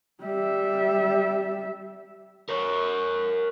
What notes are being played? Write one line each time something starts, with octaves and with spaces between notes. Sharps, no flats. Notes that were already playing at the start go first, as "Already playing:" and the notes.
G3 E5
A#4 C#5